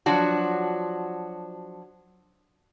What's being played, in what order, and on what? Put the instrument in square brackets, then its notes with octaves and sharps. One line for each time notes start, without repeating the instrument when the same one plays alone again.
[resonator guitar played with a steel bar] F3 F#3 D4 F#4